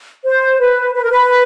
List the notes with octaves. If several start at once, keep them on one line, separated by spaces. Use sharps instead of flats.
C5
B4
B4
A#4
B4